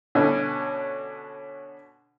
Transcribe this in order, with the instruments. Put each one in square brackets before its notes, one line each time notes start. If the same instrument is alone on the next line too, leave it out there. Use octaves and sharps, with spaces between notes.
[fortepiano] B2 D3 C#4